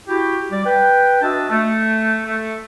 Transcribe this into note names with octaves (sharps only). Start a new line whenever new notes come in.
E4 F#4 G4
G3 D5
B4 G5
D4 F#4 D#5 E5 A5
A3
A3